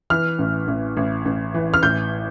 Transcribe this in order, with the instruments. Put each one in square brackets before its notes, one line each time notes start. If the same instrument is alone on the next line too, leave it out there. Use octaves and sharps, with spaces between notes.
[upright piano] E3 F6
A1
A1
A1
A1
E3
F6
A1 G6